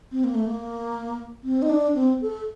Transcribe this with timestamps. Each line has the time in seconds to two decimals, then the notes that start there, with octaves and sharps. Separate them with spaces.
0.12 C4
0.24 A#3
0.35 A3
0.46 A#3
1.44 C4
1.62 D#4
1.70 D4
1.95 C4
2.21 A4